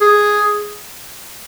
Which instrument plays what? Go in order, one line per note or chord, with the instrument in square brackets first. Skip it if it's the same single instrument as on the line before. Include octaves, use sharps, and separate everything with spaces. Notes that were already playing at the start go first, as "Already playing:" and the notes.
[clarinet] G#4